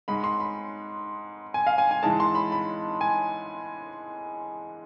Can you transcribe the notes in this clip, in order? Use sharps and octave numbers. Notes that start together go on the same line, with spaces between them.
G#2 G#3 B5
C6
B5
G#5
F5
G#5
G#5
G#2 E3 G#3 A5
C6
B5
B5
G#5